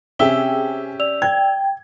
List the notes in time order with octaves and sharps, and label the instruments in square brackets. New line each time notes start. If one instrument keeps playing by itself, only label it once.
[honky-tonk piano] C3 G#4 [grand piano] C#4 G4 E5 [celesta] G5 E6 G7
[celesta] D5 E6 F7
[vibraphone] G5 [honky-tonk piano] G#6